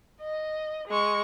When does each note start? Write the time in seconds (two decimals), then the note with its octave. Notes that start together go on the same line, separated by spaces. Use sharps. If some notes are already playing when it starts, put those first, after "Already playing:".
0.21 D#5
0.88 G#3 C#6